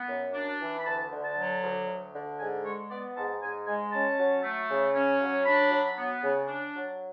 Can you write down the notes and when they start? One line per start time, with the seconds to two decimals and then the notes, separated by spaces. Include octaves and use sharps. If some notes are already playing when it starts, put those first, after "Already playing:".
Already playing: B3
0.08 F#2
0.34 D4
0.61 E3
0.79 B5
0.86 D2 A5
1.12 D3
1.24 A5
1.37 F#3
1.62 D2
1.88 D2
2.13 D3
2.39 G#2 G#5
2.65 G#3 C#5
2.90 B3 D5
3.16 G#2 A5
3.42 G#2 G#5
3.67 G#3 G#5
3.92 C#4 A5
4.19 F#3
4.43 A3
4.70 C#3
4.95 C#4
5.20 F#3
5.46 D4 B5
5.71 F#3
5.97 B3
6.23 C#3
6.48 D4
6.75 F#3